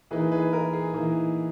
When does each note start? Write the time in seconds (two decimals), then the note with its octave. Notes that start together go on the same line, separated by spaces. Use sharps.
0.11 E3 A#3 D#4 G#4 B4
0.32 G#4 B4
0.53 A#4
0.73 G#4
0.93 E3 A#3 D#4